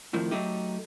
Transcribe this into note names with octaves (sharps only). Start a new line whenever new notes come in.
F2 A2 D#3 F3
F#3 A3 D#4 G4